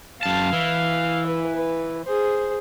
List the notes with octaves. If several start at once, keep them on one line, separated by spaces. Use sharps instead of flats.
F#2 F5 A5
E3
B4
B4
G#4 C5